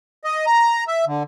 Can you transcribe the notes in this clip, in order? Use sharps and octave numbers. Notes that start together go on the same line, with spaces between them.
D#5
A#5
E5
D3